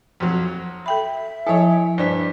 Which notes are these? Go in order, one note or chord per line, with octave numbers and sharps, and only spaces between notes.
F2 F#3
A4 E5 G5 B5
F3 E4 A4 C#5 G#5
G2 D4 C5 D5 B6